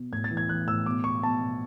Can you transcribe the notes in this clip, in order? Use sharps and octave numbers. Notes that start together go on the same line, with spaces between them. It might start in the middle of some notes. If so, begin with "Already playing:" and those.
Already playing: B2
A2 G#6
A6
E3
G#6
E3 F#6
A2 E6
B2 D6
B2 C#6
B2 A5
B2